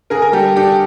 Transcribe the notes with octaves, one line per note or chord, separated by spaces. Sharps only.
D3 G#4 A#4
A#4
G3 G4 A4
D4 G4 A4